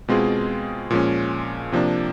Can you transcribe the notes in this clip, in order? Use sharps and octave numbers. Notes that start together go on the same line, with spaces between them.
B2 G#3 C4 F4 G#4
A#2 F3 G#3 C#4
C3 F3 A#3 D4